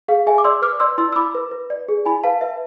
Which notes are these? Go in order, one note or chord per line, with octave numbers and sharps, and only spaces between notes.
G#4 F5
G#4 E5 G#5
D6
D5 C6 E6
B4 D6 F6
D5 C6 E6
E4 C6 E6
E6
E4 B5 D6
B4
B4
D5
G#4
E4 G#5 B5
B4 F5 A5
B4 E5